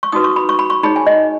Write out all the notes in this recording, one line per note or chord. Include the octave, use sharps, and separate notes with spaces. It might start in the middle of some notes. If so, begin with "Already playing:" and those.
C#6
D#4 F#4 B4 D#6
C#6
B5
C#6
B5
C#6
D#4 G#4 C#5 B5
G#5
D#5